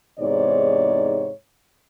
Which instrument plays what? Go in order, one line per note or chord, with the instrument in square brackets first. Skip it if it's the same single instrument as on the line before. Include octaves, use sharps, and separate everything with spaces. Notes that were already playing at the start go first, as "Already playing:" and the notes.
[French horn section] E2 G#2 C3 D#4 C#5 D5